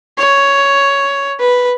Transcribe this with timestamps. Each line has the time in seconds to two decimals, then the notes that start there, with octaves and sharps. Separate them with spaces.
0.19 C#5
1.40 B4